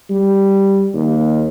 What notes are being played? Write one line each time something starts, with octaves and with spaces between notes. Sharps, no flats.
G3
D#2